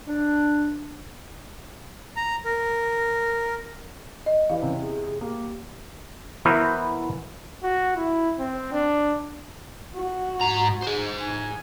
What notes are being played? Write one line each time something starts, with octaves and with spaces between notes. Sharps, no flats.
D4
A#5
A#4
D#5
E3 G4 B4 D5 F5
E2 C3 C#4
G#4
A#3 G4
E3 B3 E4 F#4 A#4 C5
F#4
E4
C4
D4
F#4
G#2 A#5
G#4 C5
G#5